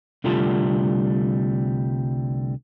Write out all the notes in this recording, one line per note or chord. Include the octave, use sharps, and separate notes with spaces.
C2 D3 G3 A3 F4 A5